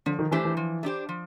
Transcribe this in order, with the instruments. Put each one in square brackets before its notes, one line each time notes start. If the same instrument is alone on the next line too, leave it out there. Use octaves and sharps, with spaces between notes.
[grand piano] D3 [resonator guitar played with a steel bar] F3
[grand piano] D#3
[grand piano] E3 [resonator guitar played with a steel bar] A3 D4 G4 C5
[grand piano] E3
[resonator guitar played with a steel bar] F3
A3 D4 G4 C5
F3